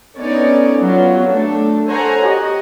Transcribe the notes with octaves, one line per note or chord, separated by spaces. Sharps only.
D3 B3 C#4 D#4 C#5 D5
F#3 B3 F4
A3 D4 A4
A4 C5 C#5 F#5 G#5 A#5
F#4 G4 D#5